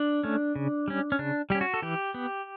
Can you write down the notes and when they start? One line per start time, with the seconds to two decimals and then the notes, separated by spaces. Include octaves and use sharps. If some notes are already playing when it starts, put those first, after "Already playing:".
Already playing: D4
0.24 A3 C#4
0.56 C#3
0.88 G3 C#4
1.12 C#4
1.19 C#3 D4
1.50 G3 C#4 G4
1.61 F#4
1.74 A4
1.82 E3 G4
2.14 B3